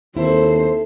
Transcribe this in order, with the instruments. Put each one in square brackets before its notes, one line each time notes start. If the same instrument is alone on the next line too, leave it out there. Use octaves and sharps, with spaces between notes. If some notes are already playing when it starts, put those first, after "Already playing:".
[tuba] D#2 [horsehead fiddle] C4 C5 [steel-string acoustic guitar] E4 A4